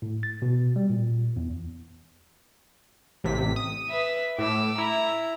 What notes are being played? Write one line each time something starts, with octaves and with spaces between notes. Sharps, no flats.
A2
A6
B2
G3
A#2
E2
A1 C3 B6
D#6
B4 E5
A2 D6 E6
E4 A#5